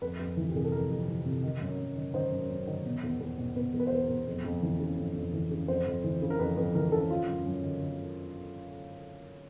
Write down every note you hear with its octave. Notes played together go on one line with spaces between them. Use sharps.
F2 B4
F2
E3
G4
C3 G#4
A4
F2 A#4
F2
E3
C3
D#3
F#2
F#2
D#3
D#3 C5
F#2
F#2
D#3
B2
E2
E2
B2
B2 B4
E2
B4
C5
E2 B4
A#4
B2
F2
F2
E3
C#3
F2
F2
E3
C#3
F2 C5
F2
E3
C#3
A#4
F2 B4
F2 B4
E3 A#4
C#3 A4
D#3 F4
F#2
F#2
D#3
D#3